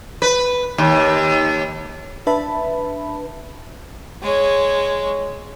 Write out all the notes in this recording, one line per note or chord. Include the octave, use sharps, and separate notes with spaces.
B4
D#2
D4 B4 E5 A5 B5
G#3 C#5